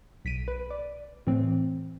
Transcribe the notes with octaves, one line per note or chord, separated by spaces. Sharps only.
B1 B6 D7 D#7
B4
D5
A2 E3 C4